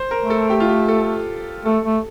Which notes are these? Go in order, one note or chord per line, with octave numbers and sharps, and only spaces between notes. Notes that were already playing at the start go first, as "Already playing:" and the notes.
Already playing: C5
A#4
A3
A4
G4
F4
G4
A4
A3 A4
A3